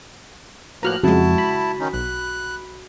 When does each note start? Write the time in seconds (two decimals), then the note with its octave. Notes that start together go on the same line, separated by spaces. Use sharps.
0.83 A2 F3 A#3 F#4 B4 A#5 F6 F#6
1.03 F2 C#3 G#3 E4 F#4 A5
1.38 B5
1.80 D#3 C#4 D#4
1.93 B1 F#6